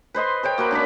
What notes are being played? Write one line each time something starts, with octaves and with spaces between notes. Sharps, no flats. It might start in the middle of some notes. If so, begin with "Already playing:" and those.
B4 C5 D#5 C6
A4 C5 C#5 G5
A#3 F#4 A#4 B4
C#4 D4 D5 B5